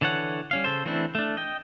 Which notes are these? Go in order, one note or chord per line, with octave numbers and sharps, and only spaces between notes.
D3 E3 A4 C#5 F#5
G3 C#4 F5
C#3 A4 C5
E3 A3 C4 D4 E4
A3 D4
D#5 G5